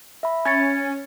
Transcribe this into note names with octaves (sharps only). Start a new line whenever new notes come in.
E5 B5
C#4 G#6 A6 C#7